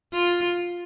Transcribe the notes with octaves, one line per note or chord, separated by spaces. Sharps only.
F4